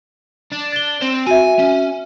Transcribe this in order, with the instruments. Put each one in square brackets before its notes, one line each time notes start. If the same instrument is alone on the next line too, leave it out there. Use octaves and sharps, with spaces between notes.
[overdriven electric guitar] D4
[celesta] A6 G7
[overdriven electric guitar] C4 C5
[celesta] F#4 E5 [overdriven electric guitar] G#5
[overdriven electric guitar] C#4